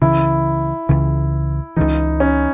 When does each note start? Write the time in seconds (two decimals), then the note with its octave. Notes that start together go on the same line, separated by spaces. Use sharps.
0.01 C#2 C#3 E3 E4
0.89 C#2 C#3 E3
1.77 C#2 C#3 E3 D#4
2.20 C#4